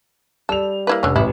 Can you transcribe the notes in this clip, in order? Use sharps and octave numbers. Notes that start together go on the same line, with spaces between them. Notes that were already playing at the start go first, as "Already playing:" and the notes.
G3 A4 F7
A#3 E4 B4
F1 D3 C#4
A1 E4